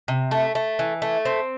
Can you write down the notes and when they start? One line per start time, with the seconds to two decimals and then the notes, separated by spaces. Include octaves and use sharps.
0.08 C3
0.31 A3
0.55 A3
0.79 E3
1.02 A3
1.25 C4